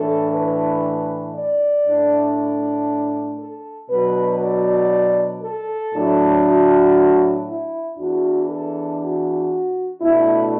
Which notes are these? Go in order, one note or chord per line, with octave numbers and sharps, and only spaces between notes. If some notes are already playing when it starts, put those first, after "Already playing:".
Already playing: A2 E3 D4 A4
B4
D5
A2 A3 D4
A4
B2 F#3 D4 B4
D5
A4
A2 F#3 D4
F#4
E4
E2 E3 D4 F#4
A4
F#4
B2 A3 D4 E4